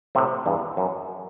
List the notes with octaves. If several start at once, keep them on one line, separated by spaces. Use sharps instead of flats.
A2 C3
E2 G2
F#2